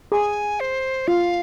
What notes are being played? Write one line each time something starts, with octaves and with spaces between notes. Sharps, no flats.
G#4 G#5
C5
F4 F5